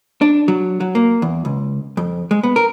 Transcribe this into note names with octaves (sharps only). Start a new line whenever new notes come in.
D4
F#3
F#3
A#3
E2
C#2
F2
G#3
B3
A#4